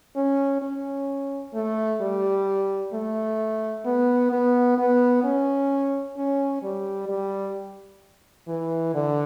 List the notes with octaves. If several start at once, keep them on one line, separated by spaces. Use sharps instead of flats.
C#4
C#4
A3
G3
A3
B3
B3
B3
C#4
C#4
G3
G3
E3
D3